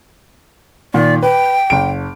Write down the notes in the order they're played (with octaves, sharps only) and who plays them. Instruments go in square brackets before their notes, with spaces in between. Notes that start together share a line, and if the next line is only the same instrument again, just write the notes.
[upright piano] A#2 D#3 [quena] D5
[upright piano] B4 [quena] G5
[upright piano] F#1 D7